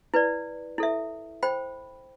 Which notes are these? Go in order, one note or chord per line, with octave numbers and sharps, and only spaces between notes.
E4 B4 D5
E4 A4 E5
C5 G5 B5